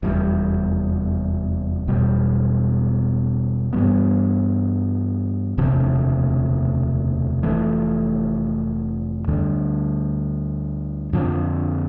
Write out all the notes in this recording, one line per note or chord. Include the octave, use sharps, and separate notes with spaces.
F1 E2 C3 G3
E1 E2 B2 G3
G2 E3 G3 B3
E1 D2 C3 F3
F1 F2 E3 A3
D2 D3 G3
F2 D3 F3 C4